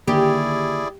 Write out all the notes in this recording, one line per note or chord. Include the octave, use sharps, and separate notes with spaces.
D3 D#3 A#3 E4 G4 G#4 D5